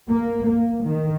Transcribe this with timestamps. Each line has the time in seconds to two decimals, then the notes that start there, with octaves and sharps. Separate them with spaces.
0.10 A#3
0.46 A#3
0.84 D#3